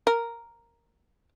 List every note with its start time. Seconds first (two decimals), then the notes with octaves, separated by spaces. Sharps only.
0.07 A#4